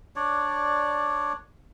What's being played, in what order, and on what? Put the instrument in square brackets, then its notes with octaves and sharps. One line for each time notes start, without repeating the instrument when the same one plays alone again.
[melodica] D4 C#5 D5